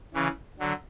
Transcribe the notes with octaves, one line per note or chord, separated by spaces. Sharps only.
C#3 E3
D3 F#3